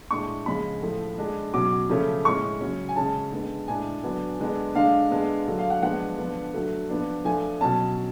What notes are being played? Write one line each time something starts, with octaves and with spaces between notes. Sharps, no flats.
A2 G#3 D4 C#6
C#3 F3 G#3 C#4 B5
A2 F3 A3
D3 G#3 D4
B2 F#3 C#4 D6
C#3 F3 A3 C#4
A2 G#3 C#4 C#6
C#3 F#3 C#4
G#5
C#3 G#3 C#4 A5
D3 G#3 B3
A2 G#3 D4 G#5
D3 F#3 B3 D4
D3 G#3 B3 D4
D3 G#3 D4 F5
D3 G#3 B3 D4
D3 F#3 A3 D4
F5
F#5
F3 G#3 B3 D4 F#5
D3 F3 B3 D4
D3 F#3 A3
F3 B3 D4
F3 A3 D4 G#5
B2 F#3 C#4 A5